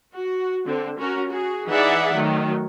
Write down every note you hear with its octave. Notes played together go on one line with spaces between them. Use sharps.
F#4
D3 C4
C#4 F#4 A#4
F#4 G#4
E3 D#4 G#4 D5 E5 F#5
D#3 F#3 A3